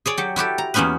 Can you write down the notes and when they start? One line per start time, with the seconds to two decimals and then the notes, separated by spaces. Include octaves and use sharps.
0.06 G#4 C#5 D5
0.17 F#3 G4
0.36 E4 F#4 G4 A4
0.58 A#5
0.74 E2 A#3 B3 C#4 D#4 B4